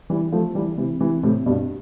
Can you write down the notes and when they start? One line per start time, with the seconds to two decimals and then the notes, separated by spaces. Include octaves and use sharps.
0.10 E3 G3
0.32 F3 A3
0.55 E3 G3
0.78 C3 E3
1.00 C3 E3
1.23 A2 C3
1.46 G2 B2